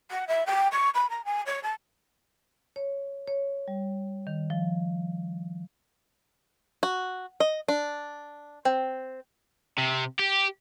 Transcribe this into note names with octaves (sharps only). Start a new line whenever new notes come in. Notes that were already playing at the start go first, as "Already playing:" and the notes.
F#5
E5
G5
C#6
B5
A#5
G#5
C#5
A5
C#5
C#5
G3
D#3
F3
F#4
D#5
D4
C4
C3
G4